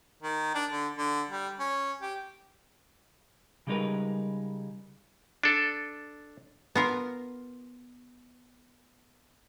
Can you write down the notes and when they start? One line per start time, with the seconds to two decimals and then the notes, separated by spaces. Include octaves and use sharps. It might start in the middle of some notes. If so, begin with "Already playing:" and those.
0.23 D#3
0.55 D4
0.70 D3
0.98 D3
1.29 G3
1.59 C#4
2.02 G4
3.67 C#3 G3 G#3 D#4 A#4 B4
5.43 D4 A4
6.75 B3 F4 A#4